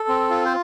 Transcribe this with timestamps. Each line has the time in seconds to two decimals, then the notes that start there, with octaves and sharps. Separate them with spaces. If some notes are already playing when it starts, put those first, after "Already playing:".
Already playing: A4
0.08 C4
0.30 F4
0.45 C5